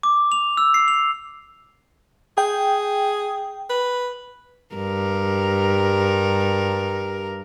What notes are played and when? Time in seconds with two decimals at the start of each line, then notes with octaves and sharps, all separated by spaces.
0.03 D6
0.32 F7
0.57 E6
0.74 C7
0.88 F7
2.38 G#4 G5
3.70 B4
4.75 G2 A#4